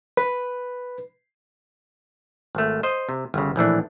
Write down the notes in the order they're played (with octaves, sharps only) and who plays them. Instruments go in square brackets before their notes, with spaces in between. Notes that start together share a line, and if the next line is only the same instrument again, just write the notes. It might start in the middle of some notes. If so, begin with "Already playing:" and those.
[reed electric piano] B4
[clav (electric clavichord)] G#1 A3
C5 D#5
C3
G1 C#3
A#1 A2 E3 D4